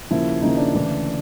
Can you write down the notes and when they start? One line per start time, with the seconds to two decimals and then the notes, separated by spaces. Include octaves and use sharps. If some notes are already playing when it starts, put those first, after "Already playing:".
0.11 D#2 C#3 F3 A#3 E4
0.42 D#2 C#3 F3 A#3 D#4
0.57 D4
0.74 D2 C#3 E3